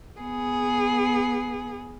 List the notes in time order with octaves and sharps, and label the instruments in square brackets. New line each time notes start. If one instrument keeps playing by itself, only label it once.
[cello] B3 G#4